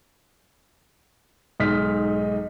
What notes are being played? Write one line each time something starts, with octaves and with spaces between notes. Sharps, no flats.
B1 G#2 D#4 F6 B6